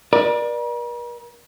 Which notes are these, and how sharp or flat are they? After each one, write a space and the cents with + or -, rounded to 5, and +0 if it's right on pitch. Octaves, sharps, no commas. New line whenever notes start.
A#4 +45 D5 +20